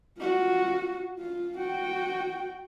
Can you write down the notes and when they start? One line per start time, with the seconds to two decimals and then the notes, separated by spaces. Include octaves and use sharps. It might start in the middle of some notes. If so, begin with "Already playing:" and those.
0.18 F4 F#4
1.18 F4
1.57 F#4 G5